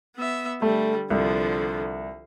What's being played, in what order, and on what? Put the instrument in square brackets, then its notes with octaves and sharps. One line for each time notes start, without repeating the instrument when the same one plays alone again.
[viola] B3 E5
[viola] D3 G3 [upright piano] A3
[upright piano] C2 [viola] D3 F3